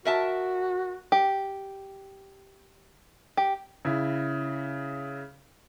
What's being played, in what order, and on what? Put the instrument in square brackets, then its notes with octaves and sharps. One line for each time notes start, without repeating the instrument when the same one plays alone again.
[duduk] F#4 [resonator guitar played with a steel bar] A#4 E5 A5
[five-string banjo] G4
G4
[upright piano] C#3 E4